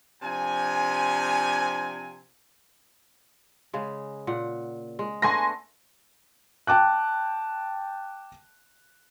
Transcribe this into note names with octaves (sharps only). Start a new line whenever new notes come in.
C3 F3 D4 G#5
C#3 G#3
A#2 F#5
G#3
A3 B3 D4 G#5 C6 A#6
G5 A5 D6 F#6